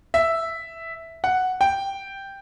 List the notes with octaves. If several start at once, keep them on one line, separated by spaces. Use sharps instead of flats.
E5
F#5
G5